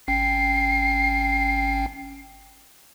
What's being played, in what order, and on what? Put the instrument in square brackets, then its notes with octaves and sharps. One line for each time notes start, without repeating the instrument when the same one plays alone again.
[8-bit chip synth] G#1 C#4 G5 [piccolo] C7